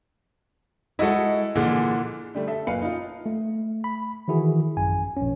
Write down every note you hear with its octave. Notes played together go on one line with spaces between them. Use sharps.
G#3 E4 F#4 A4 D#5
A#2 D3 E3 F3 G#4
D3 G3 A3
A4 E5
F#1 A#2 B4 F5 C#7
D#4 F4
A3
B5
D#3 E3 E4 F#4 G#4
A1 F#2 G#5
A#1 C#4